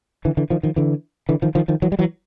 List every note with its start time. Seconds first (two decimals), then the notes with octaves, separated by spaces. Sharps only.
0.25 D3 E3
0.37 D3 E3
0.50 D#3 F3
0.63 D#3 F3
0.76 D3 E3
1.29 D3 E3
1.42 D#3 F3
1.55 D#3 F3
1.68 D#3 F3
1.82 E3 F#3
1.92 G3
1.99 E3 F#3